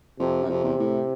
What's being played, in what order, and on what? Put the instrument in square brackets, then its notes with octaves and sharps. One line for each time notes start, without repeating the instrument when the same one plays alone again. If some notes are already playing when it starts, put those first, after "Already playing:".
[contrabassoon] F2 [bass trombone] C3
[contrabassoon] F#2
[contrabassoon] F2 [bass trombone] C3
[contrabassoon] E2
A2